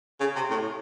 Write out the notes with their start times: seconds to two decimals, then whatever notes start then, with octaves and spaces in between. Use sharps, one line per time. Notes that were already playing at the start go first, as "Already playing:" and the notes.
0.20 C#3
0.36 C3
0.51 A2